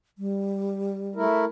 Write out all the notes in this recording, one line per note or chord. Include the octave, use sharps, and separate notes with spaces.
G3
A3 E4 A#4